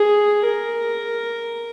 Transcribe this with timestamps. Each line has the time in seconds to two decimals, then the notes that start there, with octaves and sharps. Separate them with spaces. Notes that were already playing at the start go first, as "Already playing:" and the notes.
Already playing: G#4
0.45 A#4